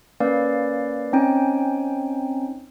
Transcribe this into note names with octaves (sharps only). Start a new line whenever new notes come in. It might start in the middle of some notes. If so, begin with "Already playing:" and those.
A#3 C#4 B4 D5 F5
C4 C#4 D#4 G5 G#5